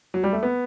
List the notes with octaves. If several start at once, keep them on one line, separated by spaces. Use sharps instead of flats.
F#3
G3
A3
B3